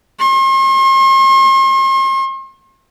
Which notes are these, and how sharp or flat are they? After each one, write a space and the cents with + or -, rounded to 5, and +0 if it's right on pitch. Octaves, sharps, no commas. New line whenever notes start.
C6 +45